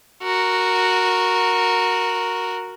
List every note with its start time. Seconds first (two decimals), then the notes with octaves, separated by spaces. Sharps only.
0.22 F#4 A#4